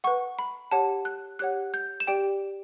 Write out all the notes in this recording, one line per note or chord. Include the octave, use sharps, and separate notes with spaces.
B4 F#5 C#6
B5
G4 C#5 F#5 A5
F#6
G4 C#5 F#5 F#6
G6
E7
G4 D5 G5 D7